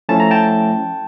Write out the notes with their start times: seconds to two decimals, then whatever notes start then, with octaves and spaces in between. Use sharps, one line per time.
0.09 F3 A3 C#4 E4 A5
0.20 A#5
0.31 G5 A5